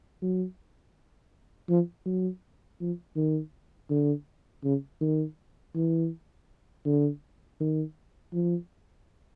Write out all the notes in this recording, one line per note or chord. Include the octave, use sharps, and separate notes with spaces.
F#3
F3
F#3
F3
D#3
D3
C#3
D#3
E3
D3
D#3
F3